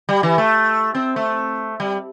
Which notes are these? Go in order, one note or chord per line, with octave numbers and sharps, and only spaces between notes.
G3
E3
A3
C4
A3
G3